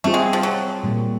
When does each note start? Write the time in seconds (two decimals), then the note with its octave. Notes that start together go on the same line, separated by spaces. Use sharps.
0.04 G3 A3 C4 F4 G#4
0.14 G#3
0.33 F3
0.43 F#3
0.83 A#2 G3 A#3